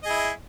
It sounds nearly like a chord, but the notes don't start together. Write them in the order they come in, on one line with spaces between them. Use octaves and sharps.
D#5 G#4 E4